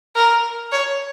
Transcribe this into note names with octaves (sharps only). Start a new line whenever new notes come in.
A#4
C#5